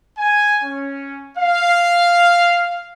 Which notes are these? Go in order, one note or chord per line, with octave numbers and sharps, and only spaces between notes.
G#5
C#4
F5